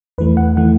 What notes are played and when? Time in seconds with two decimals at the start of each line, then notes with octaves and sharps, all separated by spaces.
0.18 E2 E3 A3 B4
0.37 F#5
0.57 E3 A3 F#5